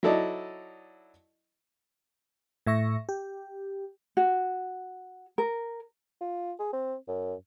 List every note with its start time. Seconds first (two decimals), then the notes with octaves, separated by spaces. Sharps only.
0.03 F#3 D#4 E4 A4 D5 D#5
2.67 A2 E5 C#6 A#6
3.09 G4
4.17 F#4
5.38 A#4
6.21 F4
6.59 G#4
6.73 C4
7.08 F#2